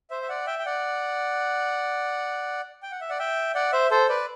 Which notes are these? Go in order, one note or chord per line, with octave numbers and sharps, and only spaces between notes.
C5 E5
E5
D5 F#5
E5 G5
G5
D5 F#5
G5
F#5
E5
D5 F#5
E5 G5
D5 F#5
C5 E5
A4 C5
B4 D5